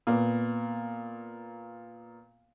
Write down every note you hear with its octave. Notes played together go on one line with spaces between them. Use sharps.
A#2 B3